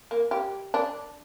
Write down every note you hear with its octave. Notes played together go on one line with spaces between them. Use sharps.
A#3
G4
D4